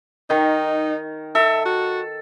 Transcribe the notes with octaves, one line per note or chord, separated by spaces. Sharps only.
D#3 D#4 A#4
A4 E5
F#4